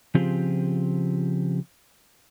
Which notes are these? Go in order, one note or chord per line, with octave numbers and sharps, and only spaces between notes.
C#3 F3 C4 F4 G4 G#4